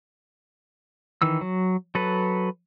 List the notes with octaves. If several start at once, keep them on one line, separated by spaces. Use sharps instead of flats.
D#3 E3 E6
F#3
F#3 A4 B4